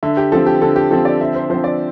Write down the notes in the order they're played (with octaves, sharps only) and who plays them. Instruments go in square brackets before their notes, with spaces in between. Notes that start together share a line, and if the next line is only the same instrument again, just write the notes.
[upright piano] D3 [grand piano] E5
[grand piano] G4
[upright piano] F3 C4 [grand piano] A4
[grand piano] G4
[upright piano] D3 [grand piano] A4
[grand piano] G4
[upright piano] F3 C4 [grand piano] A4
[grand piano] D5
[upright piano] D3 [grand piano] E5
[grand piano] C5
[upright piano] F3 C4 [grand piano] C5
[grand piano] D5